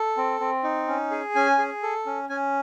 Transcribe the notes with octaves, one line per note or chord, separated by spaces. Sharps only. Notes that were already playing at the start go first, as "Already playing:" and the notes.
Already playing: A4
C4
C4
D#4
C#4
G#4
C#4 G#5
G#4
A4
C#4
C#4 G#5